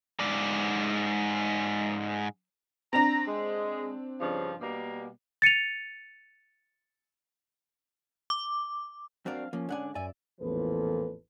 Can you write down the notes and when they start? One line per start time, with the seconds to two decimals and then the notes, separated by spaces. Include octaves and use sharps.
0.20 G#2 D5
2.93 C4 D4 A#5
3.27 G#3
4.21 G2 C#3 F3
4.61 B2 G3 A#3
5.42 A6 C#7 D#7 F7
8.30 D6
9.26 F#3 C4 D4 A#4 D5 F5
9.53 F3 A#3 C#4
9.69 G#2 D3 D4 D5 F#5 G#5
9.95 F#2 D5 E5 G#5
10.40 A1 E2 A#2 F3 A4 B4